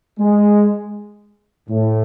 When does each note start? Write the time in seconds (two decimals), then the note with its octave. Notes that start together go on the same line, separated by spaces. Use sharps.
0.20 G#3
1.69 A2